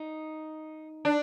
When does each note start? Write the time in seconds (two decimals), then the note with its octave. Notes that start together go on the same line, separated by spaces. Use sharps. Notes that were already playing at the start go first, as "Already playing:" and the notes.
Already playing: D#4
1.05 D4